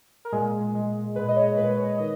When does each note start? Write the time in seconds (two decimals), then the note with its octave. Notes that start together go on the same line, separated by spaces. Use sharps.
0.25 A#4
0.32 A#2 G#3 G#4
0.73 A#2 G#3
1.15 A#2 G#3 B4
1.28 D#5
1.36 C#5
1.57 A#2 G#3 B4
1.77 C#5
1.98 D#3 D#5